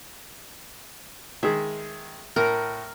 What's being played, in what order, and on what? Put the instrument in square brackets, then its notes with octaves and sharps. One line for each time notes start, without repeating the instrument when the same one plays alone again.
[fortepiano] D#3 G#3 G#4 [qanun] E5
[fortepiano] A2 [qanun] A#4